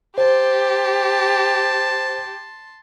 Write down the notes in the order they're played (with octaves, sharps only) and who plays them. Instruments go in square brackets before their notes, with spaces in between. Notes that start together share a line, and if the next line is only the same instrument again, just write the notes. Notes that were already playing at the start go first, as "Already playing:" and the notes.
[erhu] G4 [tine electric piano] C5 [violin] A5 C6